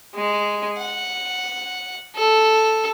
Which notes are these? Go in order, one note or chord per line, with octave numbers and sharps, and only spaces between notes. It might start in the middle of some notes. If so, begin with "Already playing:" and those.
G#3
F#5
A4